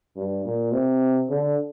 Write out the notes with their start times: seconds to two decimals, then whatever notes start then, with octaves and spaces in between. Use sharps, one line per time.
0.16 G2
0.45 A#2
0.72 C3
1.30 D3